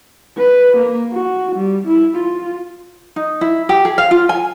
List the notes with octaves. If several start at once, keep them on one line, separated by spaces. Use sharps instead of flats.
B4
A#3
F#4
G3
E4
F4
D#4
E4
G4
G#4
F5
F4
G#5